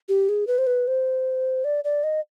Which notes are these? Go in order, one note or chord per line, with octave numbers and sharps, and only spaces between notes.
G4
G#4
B4
C5
B4
C5
D5
D5
D#5